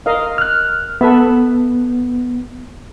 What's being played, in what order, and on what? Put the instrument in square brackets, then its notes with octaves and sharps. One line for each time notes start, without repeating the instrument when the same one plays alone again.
[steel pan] A#4 D#5 F5
[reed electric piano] F6 F#6
[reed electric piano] B3 [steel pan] A4 B4 E5